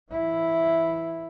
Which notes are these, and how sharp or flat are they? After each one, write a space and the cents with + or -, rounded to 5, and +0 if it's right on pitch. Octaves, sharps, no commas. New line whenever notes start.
E3 +5 E4 +0